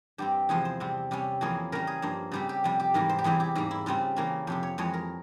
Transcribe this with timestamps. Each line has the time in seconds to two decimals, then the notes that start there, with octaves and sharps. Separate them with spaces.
0.18 G2 G3 C4 G4
0.49 E2 C3 F3 G#3 G#4
0.65 C5
0.80 C3 G3 C4
1.11 C3 G3 C#4
1.41 F2 E3 A#3 C#4 G#4
1.72 C#3 G3 C#4 A#4
1.87 G#4
2.02 G2 F3 A#3
2.31 C#3 G3 C4 G4
2.49 G4
2.64 F2 C3 G3
2.80 G4
2.94 G#2 E3 G3 A#4
3.09 C5
3.18 G4
3.24 E2 E3 G3 C4 G#4
3.40 G4
3.55 G#2 G3 A#3 G4
3.71 E4
3.86 C#3 G3 C4 F4
4.16 C#3 E3 A#3 C#4
4.47 F2 C3 F3 G4
4.63 C#5
4.78 F2 E3 G#3 C#5
4.94 A#4